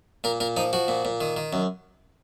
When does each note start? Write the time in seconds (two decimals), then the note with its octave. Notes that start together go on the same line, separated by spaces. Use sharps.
0.24 A#2 A#4
0.40 A#2 A#4
0.57 F3 D#4
0.73 F3 F#4
0.88 A#2
1.05 A#2
1.21 D#3
1.36 D#3
1.53 F#2